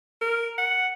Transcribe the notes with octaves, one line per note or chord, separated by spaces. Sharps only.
A#4
F#5